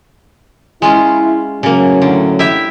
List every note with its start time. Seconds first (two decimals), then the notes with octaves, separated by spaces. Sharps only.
0.82 G#3 C#4 E4 F4
1.63 A2 C#3 F#3 A#3 C#4
2.02 D3
2.39 E4 G4 E5